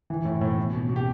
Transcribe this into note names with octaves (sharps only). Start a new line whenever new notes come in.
E3
A2
A2
B2
B2
B2
G4